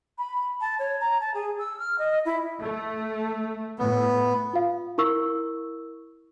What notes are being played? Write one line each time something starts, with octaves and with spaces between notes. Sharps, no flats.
B5
A5
C#5
A#5
A5
G#4
E6
F6
D#5
E4
A3
A2 B3
F4 F5
E4 A#4 C#6 E6